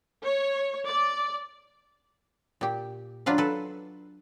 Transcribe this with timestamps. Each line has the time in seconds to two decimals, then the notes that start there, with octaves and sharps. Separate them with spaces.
0.24 C#5
0.87 D5
2.61 A#2 G4
3.26 F#3 D4 F4 B4 F5
3.38 A4 B4